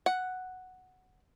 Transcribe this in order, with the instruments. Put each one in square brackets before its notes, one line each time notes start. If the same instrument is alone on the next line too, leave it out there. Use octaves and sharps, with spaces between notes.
[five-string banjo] F#5